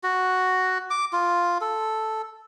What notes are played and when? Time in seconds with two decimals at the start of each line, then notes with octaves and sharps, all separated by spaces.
0.03 F#4
0.90 D6
1.13 F4
1.61 A4